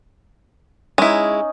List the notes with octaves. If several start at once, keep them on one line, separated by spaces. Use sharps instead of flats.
G#3 C#4 D#4 E4